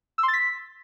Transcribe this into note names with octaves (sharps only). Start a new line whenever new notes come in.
E6
C6
A6
B6